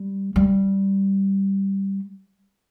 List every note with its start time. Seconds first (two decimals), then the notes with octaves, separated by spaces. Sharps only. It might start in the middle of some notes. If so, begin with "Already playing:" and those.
Already playing: G3
0.36 G3